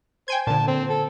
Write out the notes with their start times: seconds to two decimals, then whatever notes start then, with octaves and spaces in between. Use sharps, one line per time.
0.28 C5 G5 G#5 G#6
0.47 A#2 D3 A5
0.68 C4
0.90 A4